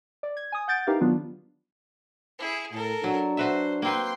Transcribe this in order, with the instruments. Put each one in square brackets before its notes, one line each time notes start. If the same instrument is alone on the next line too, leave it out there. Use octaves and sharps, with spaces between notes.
[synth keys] D5
G#6
G#5 D#6
F#5 G6 A6 D7
D#4 E4 G4 A#4 B4 F5
D#3 F#3 B3 D4 F4
[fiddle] E4 G#4
[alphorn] A2 [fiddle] A4 A#4
[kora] F#3 [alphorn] D4
[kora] F#4 B4 E5 [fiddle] C5
[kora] A#3 C4 B4 [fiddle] G5 C6